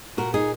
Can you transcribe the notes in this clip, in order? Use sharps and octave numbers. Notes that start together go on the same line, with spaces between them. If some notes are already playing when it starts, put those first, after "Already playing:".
A#2 F#4 A#4
D#4 G#4